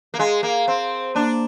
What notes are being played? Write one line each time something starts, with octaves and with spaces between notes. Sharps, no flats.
A#3
G#3
A#3
C4
A#3 D4